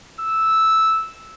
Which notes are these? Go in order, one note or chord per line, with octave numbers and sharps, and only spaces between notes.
E6